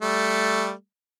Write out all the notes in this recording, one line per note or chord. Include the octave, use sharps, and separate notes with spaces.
G3 A3